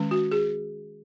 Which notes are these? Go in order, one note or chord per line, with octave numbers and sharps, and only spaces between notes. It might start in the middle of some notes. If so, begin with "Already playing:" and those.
Already playing: D#3 G#3 C#4
F#4
G#4